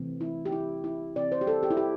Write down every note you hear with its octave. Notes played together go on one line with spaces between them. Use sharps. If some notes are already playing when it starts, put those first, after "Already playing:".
Already playing: C3 E3 A3 C4
E4
G4
E4
E4
C3 E3 C4 D5
C5
G4
A4
G4
E4
G4